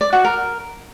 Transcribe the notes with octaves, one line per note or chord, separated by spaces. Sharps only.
D5
F#4
A#4